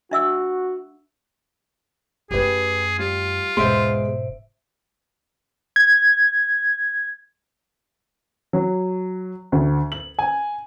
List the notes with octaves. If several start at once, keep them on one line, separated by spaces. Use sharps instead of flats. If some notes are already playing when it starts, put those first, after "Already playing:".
D4 F#4 E5 E6
F#2 A3 G4 G#4 B4
G3 F4
E1 G#2 G#3 B3 C5 E5 C6 D7
G#6
F#3
D2
F#7
G#5